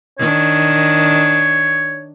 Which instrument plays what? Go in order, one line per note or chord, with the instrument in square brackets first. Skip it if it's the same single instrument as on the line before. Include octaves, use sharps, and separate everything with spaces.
[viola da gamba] D#3 D4 [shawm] C#5